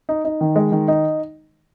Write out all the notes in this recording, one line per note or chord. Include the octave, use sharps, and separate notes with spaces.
D#4
D#4
D#3
G#3
D#3
D#4